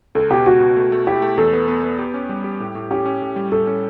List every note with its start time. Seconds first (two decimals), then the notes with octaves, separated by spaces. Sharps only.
0.15 C#2 A4
0.30 B2 G4
0.46 C#2 F#4
0.61 B2
0.76 A3
0.92 A3
1.07 E4 G4
1.22 A3
1.38 E2 A4
1.53 B3
1.68 B3
1.83 B3
1.99 G4
2.14 C#4
2.29 G3
2.44 G4
2.60 A2
2.75 A2
2.91 C#4 G4
3.05 C#4
3.22 A2
3.36 G3
3.52 A2 A4
3.67 C#4